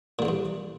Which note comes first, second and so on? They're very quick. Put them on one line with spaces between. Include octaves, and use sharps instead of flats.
A#2 D3 E2 G2